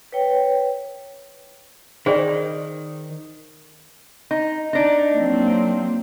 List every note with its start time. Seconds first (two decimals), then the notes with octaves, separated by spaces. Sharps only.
0.12 B4 C#5 G5
2.06 D#3 G#4 C5 D5
4.31 D#4
4.73 D4 D#4
5.16 F#3 A#3 C4